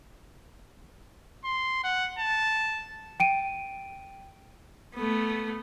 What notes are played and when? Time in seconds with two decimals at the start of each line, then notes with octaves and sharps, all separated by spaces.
1.45 C6
1.84 F#5
2.19 A5
3.20 G5 D7 D#7
4.95 A3 B3